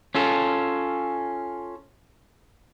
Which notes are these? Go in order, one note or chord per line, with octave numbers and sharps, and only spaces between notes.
C#4 F4 A4